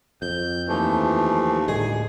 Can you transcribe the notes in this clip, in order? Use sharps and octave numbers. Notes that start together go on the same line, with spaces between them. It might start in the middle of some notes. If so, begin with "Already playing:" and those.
F2 G6
D#2 E3 F3 A3
D2 A2 G#3 G#4